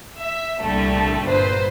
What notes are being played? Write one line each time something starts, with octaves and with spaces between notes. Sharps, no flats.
E5
C2 A#2 D3 G3 A3
G1 A#2 B4 C5